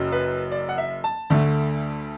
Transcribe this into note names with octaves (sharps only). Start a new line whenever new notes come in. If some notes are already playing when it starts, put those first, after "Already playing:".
Already playing: F#1 F#2 F#3
B4
D5
F#5
E5
A5
D2 D3 A3